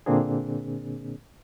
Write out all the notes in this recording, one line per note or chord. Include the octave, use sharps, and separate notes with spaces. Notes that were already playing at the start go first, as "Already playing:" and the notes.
A#2 D3 A#3 C4 D4 G#4